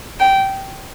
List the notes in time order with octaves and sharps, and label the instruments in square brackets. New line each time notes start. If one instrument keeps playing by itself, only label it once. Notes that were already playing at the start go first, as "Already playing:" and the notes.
[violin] G5